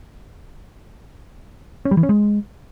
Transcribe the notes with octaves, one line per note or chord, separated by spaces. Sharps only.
C#4
G3
E3
C#4
G#3